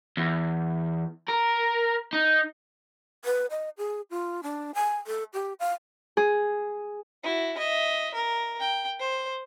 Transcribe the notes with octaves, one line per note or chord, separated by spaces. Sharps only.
E2
A#4
D#4
B4
D#5
G#4
F4
D4
G#5
A4
G4
F5
G#4
E4 F#4
D#5 E5
A#4
G5
C5